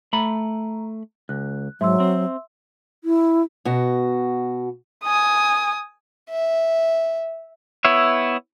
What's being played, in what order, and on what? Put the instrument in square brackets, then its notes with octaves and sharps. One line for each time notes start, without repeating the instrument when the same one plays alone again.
[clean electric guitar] A3 B5 [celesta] A#5
[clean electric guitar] C#2 [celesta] F#6
[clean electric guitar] G#2 [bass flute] F#3 [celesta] E5 C6 E6
[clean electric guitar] C4
[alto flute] E4
[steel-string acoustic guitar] B2 F#4
[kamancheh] G#5 D#6
[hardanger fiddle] E5
[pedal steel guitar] B3 E4 C#5 E5